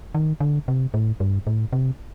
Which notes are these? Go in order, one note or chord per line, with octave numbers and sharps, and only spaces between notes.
D#3
D3
C3
A2
G2
A2
C3